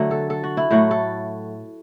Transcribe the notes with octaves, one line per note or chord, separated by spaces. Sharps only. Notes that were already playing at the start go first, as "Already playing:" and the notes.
Already playing: D3 F#3 A3
A4
A4
F#4
E4
A2 F#3 A3 F#4
A4